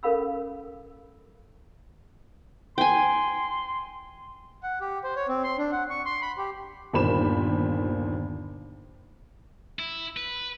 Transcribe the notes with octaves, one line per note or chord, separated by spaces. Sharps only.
C#4 A4 A#4 F5 B5 E6
G5 G#5 C6
F#5
G4
C5
C#5
C4
C6
D4
F#5
C#6
C6
B5
G4
G1 D#2 A#2 C5 B5 E7
E4
B4